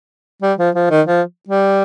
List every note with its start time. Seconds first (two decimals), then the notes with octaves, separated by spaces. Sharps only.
0.42 G3
0.59 F3
0.75 F3
0.91 D#3
1.07 F3
1.49 G3